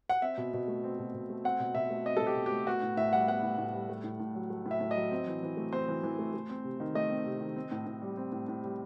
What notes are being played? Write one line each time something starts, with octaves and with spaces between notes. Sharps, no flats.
F#5
C4 E5
B2
B2
A3
C4
B2
B2
A3
C4 F#5
B2
B2 E5
A3
C4 D#5
A4
B2
G4
B2
G4
A3
B3 F#4
A2
A2 E5
G3 F#5
B3 F#5
A2
A2
G3
A3
A2
A2
F#3
A3
A2
E5
A2
D#5
F#3
C4
E3
E3
A3
C4 C5
E3
E3
A3
A3
C4
C3
D#3
A3 D#5
C4
C3
D#3
C4
A2
A2
G3
C4
A2
A2
G3